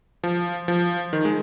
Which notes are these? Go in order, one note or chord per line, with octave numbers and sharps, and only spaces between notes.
F3
F3
D#3
G#3